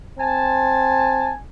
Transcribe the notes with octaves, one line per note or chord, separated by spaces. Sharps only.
C4 G#5 A5